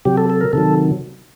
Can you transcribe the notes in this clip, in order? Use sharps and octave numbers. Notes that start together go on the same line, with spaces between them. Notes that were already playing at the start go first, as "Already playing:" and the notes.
C3 F#3 G4
A4
A4
A#4
C3 D#3 F#3 A4